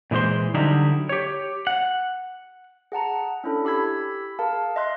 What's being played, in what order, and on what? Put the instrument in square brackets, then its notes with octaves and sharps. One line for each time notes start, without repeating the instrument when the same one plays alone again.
[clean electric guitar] A#2 E3 G#3 C5 C6
D3 F#3 G3 D#4 E4 G4
G4 C#5
F#5
[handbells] G#4 F#5 A5 A#5
C#4 D4 E4 A4
G4 B5 E6 G#6 B6
G#4 A#4 F5 A5
D#5 E5 C6 F#6